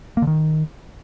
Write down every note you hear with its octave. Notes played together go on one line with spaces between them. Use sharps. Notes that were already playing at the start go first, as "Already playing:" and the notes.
A#3
D3
D#3